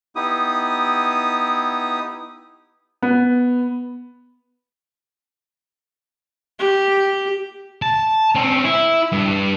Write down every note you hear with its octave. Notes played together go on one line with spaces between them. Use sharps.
B3 D#4 E4 G4 D#6
B3
G4
A5
C4 C#4
E4
G2